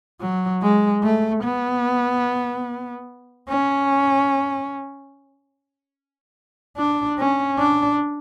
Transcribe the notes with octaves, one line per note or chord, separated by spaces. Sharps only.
F#3
G#3
A3
B3
C#4
D4
C#4
D4